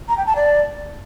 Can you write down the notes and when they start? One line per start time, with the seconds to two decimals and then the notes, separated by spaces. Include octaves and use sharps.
0.08 A#5
0.17 G5
0.26 A5
0.35 D5